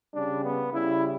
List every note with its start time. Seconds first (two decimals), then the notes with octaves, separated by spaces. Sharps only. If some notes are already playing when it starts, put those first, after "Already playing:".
0.12 C#3 G3 D4
0.42 B3
0.72 C#3 G3 E4